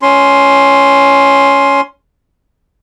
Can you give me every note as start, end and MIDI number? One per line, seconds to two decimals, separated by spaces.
0.02 1.81 61
0.02 1.81 84